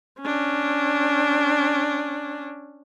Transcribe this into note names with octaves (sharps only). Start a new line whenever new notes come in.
C#4 D4